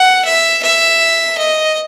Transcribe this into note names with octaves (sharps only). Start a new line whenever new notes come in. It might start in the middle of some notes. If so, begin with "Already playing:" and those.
Already playing: F#5
E5
E5
D#5